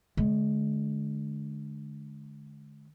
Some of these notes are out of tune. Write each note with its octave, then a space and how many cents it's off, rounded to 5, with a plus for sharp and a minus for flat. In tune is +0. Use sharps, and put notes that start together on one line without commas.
D3 +0 G#3 +35